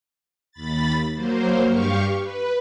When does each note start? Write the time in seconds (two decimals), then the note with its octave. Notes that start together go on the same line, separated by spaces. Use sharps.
0.52 D#2 B5 A6
1.14 F#3 A#3 C5
1.65 G2 G4 F5 C#6
2.19 B4